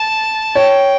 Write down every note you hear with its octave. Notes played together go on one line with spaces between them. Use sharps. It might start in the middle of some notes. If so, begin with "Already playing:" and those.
Already playing: A5
C#5 G5